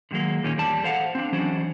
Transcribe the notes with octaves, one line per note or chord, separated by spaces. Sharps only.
D3 D#3 F#3 G#3 A#3
D#2 A#2 D#3 A#3 C#4
E2 G3 D5 A5
A4 C5 F5 F#5
C4 D4
E3 F#3 C#4 D4 C5